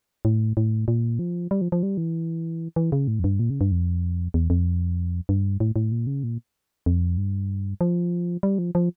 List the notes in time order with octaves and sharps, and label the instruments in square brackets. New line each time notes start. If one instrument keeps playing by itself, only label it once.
[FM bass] A2
A2
A#2
F3
G3
F3
F3
G3
E3
E3
C#3
A2
F2
G2
A#2
C#3
G2
F2
E2
F2
G2
A2
A2
A#2
C#3
A#2
F2
G2
F3
G3
F3
F3